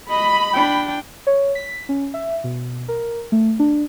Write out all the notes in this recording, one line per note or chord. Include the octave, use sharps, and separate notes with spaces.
D#5 B5
D4 G5
C#5
B6
C#4
E5
B2
A#4
A3
D4